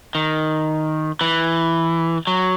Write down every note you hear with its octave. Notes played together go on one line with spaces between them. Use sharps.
D#3
E3
F#3